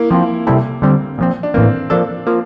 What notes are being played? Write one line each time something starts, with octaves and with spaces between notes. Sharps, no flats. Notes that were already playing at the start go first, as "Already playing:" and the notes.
Already playing: A#3 E4
F3 A#3 C4 F4
C3 G3 C4 E4 A4
D3 G3 C4
A#2 F3 C4
D4
A2 E3 A#3 C4
F3 A#3 D4 A4
F3 A#3